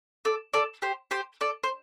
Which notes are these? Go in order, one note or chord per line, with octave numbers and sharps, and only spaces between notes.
A4 D5
A4 D5
G4 C5
G4 C5
A4 D5
C5